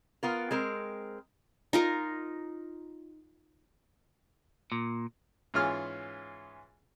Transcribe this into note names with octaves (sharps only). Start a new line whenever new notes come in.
B3 F4 A#4
G#3 C4 A#4
D#4 F4 A#4
A#2
G#2 E3 C#4 F4 G#4 F6